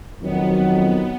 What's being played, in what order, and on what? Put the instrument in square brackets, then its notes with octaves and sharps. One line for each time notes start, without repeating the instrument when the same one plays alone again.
[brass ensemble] F2 D#3 F#3 [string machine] B3